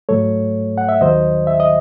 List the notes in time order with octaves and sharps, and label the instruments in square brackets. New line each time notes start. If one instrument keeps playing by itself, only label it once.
[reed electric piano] G#2 F#3 A3 A4 C#5
F#5
E5
D#2 D#3 F#3 C5 D#5
E5
D#5